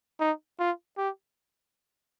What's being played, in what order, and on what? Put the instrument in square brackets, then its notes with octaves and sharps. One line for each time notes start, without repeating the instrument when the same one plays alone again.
[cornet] D#4
F4
G4